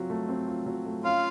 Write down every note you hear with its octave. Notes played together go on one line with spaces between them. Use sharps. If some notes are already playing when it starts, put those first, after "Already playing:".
Already playing: F#3 C4 F4
A3
C4
F4
F#3
A3
C#4 F4 F5